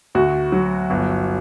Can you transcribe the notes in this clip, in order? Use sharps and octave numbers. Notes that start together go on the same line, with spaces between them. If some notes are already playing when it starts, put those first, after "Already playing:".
D2 F#4
F#3
G1